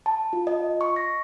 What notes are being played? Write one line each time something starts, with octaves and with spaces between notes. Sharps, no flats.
A5
F4
D#5
C#6
A#6